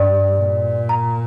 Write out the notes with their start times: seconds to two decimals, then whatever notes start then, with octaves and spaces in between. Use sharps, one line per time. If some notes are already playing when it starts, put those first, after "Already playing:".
Already playing: G2 D5
0.37 A#2
0.89 A#5